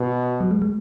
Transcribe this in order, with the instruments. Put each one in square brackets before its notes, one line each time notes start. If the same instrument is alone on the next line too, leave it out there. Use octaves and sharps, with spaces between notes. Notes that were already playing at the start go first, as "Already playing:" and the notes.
Already playing: [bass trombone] B2
[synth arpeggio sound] F#3
G#3
G#3